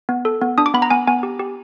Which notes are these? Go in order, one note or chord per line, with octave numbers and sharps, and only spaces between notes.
B3
A4
B3
D4 D#6
D6
B3 B5
A#5
B3 G#5
B3 G#5
G4
G4